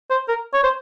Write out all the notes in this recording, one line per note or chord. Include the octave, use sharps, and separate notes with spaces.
C5
A#4
C#5
C5